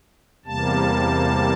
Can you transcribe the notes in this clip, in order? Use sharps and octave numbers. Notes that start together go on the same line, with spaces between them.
E2 C3 G3 A#3 A5